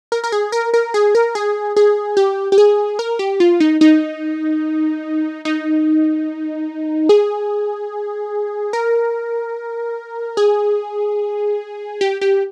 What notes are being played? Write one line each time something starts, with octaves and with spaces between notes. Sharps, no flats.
A#4
A#4
G#4
A#4
A#4
G#4
A#4
G#4
G#4
G4
G4
G#4
A#4
G4
F4
D#4
D#4
D#4
G#4
A#4
G#4
G4
G4